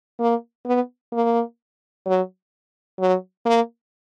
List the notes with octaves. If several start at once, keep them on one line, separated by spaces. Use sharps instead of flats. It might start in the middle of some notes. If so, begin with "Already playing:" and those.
A#3
B3
A#3
F#3
F#3
A#3